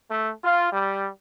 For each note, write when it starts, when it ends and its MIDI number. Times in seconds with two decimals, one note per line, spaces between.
0.10 0.30 57
0.43 0.71 65
0.72 1.07 55